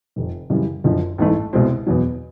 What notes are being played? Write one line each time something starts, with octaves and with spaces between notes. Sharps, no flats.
F1 F2 C3
F#2 C#3 E3 G3
F#1 F#2 D3 F3
A1 G#2 E3 A3
C2 B2 G#3 C4
E2 B2 F#3